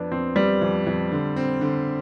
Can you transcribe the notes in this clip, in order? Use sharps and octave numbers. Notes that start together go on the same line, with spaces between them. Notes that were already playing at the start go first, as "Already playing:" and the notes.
Already playing: F2 B3 D4
F2 C4
G3 B3
F2
F2
D3
C4
D3